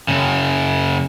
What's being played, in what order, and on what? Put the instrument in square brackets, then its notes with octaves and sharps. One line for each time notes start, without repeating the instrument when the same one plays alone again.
[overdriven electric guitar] F#2 C#3